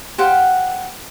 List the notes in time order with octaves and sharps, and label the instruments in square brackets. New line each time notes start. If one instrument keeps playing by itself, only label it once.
[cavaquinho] G4 C5 F5 F#5